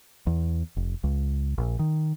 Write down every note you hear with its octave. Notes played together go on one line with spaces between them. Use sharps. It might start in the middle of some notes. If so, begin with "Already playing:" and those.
E2
F1
C#2
A#1
D#3